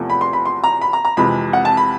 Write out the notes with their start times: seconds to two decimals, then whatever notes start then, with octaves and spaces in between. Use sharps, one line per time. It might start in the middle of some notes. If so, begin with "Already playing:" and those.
Already playing: E2 C3 F3 A3
0.10 B5
0.21 C6
0.33 B5
0.45 C6
0.64 A#5
0.81 B5
0.93 A#5
1.05 A#5
1.17 F2 C3 E3 G#3 B5
1.53 F#5
1.65 A5
1.77 B5